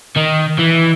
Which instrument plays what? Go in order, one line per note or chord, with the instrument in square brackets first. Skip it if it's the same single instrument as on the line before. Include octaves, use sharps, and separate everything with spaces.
[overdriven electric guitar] D#3
E3